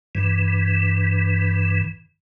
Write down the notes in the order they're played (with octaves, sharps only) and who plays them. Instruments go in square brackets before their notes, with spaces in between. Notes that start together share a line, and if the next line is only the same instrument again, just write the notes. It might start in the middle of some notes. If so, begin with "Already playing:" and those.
[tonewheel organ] G2 E3